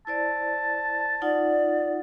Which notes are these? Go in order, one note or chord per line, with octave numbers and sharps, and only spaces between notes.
E4 C5 D5 A5
D#4 F4 D5 F#5